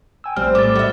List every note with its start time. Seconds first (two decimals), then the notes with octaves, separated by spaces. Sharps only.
0.24 G5 G#5 E6
0.36 A#1 G3 C4 F6
0.55 A2 D6 A6
0.75 G3 F#4 E5